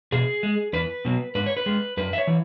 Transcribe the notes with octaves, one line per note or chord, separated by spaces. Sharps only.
B2 G#4
G#3
E2 B4
B2 F#3
G#2 B4
C#5
B4
G#3
F#2 B4
E5
C#5
E3